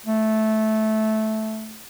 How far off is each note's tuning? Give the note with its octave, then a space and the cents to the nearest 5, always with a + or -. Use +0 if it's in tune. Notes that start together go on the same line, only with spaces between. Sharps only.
A3 -10